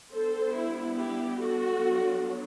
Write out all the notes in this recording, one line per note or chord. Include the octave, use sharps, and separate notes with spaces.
G3 B3 D4 A4 C5
E4
E4 G4
F#4 A4
F#3 B3 D4